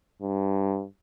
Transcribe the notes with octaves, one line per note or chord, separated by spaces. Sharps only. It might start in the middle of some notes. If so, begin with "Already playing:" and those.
G2